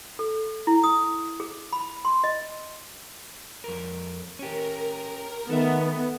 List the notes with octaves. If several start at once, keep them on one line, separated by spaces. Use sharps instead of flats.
A4
E4
D#6
G#4
B5
C6
D#5
F2 A#4
C#4 G4 A#4
D#3 B3 A4 E5